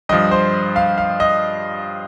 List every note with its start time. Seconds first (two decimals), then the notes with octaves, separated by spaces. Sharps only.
0.09 G2 F3 D#5
0.31 C5
0.76 F5
0.98 F5
1.20 D#5